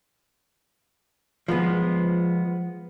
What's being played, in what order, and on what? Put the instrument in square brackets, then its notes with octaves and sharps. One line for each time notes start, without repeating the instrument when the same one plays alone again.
[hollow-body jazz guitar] F3 G#3 B3